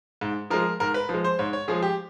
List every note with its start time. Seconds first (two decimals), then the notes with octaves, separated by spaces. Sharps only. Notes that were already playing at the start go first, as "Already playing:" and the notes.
0.21 G#2
0.50 F3 G#3 A#4
0.80 G#2 A#4
0.94 B4
1.09 F3 G#3
1.24 C5
1.39 G#2 C#5
1.53 C#5
1.68 F3 G#3 G#4
1.82 G4